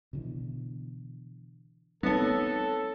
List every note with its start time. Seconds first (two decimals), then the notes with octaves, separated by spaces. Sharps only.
0.13 B2 D3 E3
2.03 G3 A3 B3 C4 D#4 A4 C#5 A5